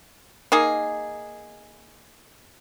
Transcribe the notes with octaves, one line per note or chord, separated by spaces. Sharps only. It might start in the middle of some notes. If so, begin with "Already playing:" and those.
A#3 D#4 G#4